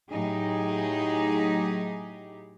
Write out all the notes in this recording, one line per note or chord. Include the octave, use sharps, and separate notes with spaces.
A2 F#3 D#4 G4 G#4